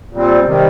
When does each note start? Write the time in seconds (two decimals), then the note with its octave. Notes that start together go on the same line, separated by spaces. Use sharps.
0.13 A#2 G3 C4
0.46 C3 D#3 G3